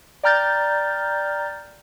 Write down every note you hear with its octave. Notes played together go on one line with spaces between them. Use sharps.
D5 G5 A#5 F6 G6 A6